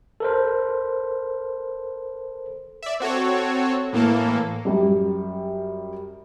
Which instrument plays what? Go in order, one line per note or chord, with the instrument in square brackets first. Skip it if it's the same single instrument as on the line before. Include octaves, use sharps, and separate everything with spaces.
[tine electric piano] A4 A#4 C5
[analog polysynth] D5 E5
C4 F#4 A4 C#5
A2 E3 A#3 A4
[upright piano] F#2 G3